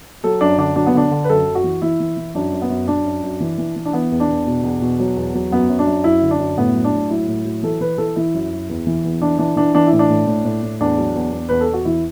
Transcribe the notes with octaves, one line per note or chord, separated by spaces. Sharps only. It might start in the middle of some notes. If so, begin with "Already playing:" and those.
F#3 A4
F#2 D4
D3 D4
F#3 D4
B3
D3 D4
D3
B4
F#2 A4
F#2
F#4
E3
E3 E4
E3
E3
F#2 D4
F#2
B3
F#2
F#3 D4
F#2
F#2
E3
E3
E3
D4
E3 B3
E2
D4
E2
B2
E2
B2
F#3
E2
F#3
F#2 B3
F#2
D4
F#2
F#2 E4
D3
D4
F#2
A2 B3
F#3
D4
A2
F#3 E4
A2
F#3
E3 A4
E3 B4
E3 A4
E3 E4
F#2
F#2
E2
E3
E2
E3 D4
E3 D4
E3 D4
E3 D4
E4
A2
D4
A2
A2
A2
A2
E2 D4
F#3
E2
E2
E2 B4
A4
E2
F#4
E3 E4